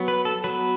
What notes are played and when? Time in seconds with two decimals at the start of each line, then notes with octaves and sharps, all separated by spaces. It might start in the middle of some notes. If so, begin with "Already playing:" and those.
Already playing: F#3 B3
0.08 B4
0.25 A4
0.44 F#3 B3 B4